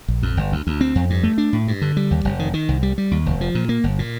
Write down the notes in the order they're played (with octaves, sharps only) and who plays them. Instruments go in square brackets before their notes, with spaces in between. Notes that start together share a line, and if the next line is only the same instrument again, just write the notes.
[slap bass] A#1
F2
G1
D2
D2
C4
F2
G2
A3
D4
A2
G2
D3
G3
D#2
F1
D#3
D#3
C2
G3
G3
D#2
F1
F3
A#2
A#3
G1
A#2